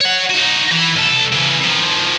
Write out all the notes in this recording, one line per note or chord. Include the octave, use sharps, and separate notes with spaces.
C#5 F#5
D#4 F#4
E3
B1 A4
C#3 E3
D#3 F3